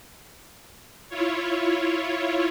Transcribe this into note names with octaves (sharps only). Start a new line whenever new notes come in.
E4 F4 C#5